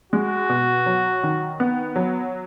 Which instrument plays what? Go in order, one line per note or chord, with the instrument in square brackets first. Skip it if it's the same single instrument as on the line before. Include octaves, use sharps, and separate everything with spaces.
[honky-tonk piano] G#3 [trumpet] F#4
[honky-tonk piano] B2
F#3
D#3
B3
F#3